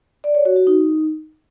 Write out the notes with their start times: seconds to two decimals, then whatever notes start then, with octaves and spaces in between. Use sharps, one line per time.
0.24 D5
0.35 C#5
0.45 F#4
0.56 F#4
0.67 D#4